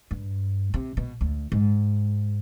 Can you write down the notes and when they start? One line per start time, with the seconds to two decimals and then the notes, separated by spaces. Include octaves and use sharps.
0.11 G2
0.74 C3
0.97 B2
1.21 D2
1.52 G#2